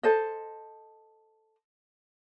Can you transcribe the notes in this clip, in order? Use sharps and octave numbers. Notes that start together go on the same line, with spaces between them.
A4 C5 D#5